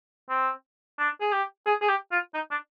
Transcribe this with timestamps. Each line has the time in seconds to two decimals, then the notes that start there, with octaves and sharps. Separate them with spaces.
0.29 C4
0.98 D4
1.21 G#4
1.32 G4
1.66 G#4
1.82 G#4
1.88 G4
2.12 F4
2.34 D#4
2.51 D4